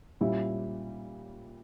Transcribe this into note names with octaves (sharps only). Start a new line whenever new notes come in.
A#2 G3 C#4 E4